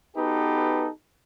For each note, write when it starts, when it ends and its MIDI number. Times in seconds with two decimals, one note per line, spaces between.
0.16 0.88 59
0.16 0.88 63
0.16 0.88 66
0.16 0.88 67
0.16 0.88 69
0.16 0.88 71